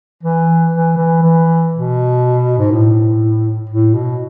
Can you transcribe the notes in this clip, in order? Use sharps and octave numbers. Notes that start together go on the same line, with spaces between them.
E3
E3
E3
E3
B2
G#2
A2
A2
B2